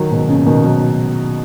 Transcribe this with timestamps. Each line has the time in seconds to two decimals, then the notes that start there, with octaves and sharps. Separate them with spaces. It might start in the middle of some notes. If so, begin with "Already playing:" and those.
Already playing: D#3 F#3
0.11 G#2 B2
0.28 A#2 C#3
0.46 B2 D#3
0.64 D#3 F#3